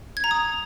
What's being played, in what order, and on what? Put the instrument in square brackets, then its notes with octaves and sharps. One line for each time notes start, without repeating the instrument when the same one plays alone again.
[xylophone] G#6
A#5
D#6